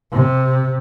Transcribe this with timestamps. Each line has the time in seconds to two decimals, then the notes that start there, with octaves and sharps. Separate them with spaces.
0.13 C3